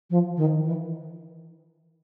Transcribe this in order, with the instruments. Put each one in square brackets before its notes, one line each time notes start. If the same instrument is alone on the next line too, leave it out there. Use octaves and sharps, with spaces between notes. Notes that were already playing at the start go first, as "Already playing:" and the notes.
[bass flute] F3
D#3
E3